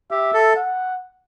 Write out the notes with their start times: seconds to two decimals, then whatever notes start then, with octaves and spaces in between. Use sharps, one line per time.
0.11 G4 E5
0.34 A4
0.56 F#5